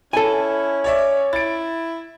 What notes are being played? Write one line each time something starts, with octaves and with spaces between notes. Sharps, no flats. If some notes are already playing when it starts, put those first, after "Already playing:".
C#4 E4 A4 G#5
C#5 D5 E5
E4 A6 D7